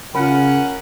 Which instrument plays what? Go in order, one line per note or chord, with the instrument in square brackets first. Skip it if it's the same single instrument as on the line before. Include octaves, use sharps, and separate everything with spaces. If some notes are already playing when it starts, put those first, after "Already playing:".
[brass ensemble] C#3 [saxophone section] C#4 A#4 [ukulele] F4 B5 [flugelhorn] F#5